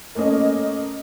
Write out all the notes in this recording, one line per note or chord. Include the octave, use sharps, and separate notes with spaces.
A3 A#3 C#4 D#5